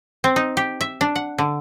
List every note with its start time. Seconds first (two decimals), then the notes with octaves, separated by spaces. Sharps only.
0.24 C4
0.36 D#4
0.57 G4
0.81 E5
1.01 D4
1.15 F#5
1.38 D3